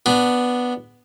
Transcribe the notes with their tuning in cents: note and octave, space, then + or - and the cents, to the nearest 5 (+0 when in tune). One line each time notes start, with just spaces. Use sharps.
B3 +0 D4 +0